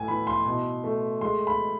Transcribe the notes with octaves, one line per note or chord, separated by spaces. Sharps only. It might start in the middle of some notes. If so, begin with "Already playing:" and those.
Already playing: A2 G#5
E3 B5
C6
B2
A3
G#3 C6
B5